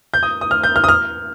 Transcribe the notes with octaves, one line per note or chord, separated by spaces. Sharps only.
G6
D#6
D#6
F6
G6
F6
D#6
F6